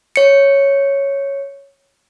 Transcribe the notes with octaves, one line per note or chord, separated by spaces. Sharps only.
C#5 C#7